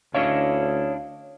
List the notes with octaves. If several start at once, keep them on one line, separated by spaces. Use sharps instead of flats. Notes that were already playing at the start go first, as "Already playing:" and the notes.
D2 C#4 D4 E4 C#5 D#5 F5